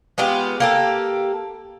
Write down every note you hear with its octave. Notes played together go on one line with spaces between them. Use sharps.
G#3 B3 F4 G4
A#3 G4 A4